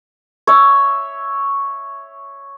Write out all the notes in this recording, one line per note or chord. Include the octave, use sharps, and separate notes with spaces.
C#5 E5